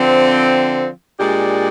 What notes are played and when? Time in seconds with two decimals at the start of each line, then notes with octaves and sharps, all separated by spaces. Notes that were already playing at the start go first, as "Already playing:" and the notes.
Already playing: D3 F3 C4
1.19 A#2 G#3 D4 G4